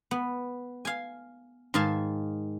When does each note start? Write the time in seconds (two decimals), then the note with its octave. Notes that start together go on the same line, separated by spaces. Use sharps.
0.11 B3
0.85 F5 G#5
1.74 G#2 D#3 F5 G#5 A5